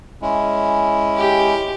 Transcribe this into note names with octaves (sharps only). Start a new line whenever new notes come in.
G#3 C#4 E4
G4